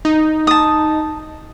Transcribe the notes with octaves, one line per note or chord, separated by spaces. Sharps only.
D#4
A5 D#6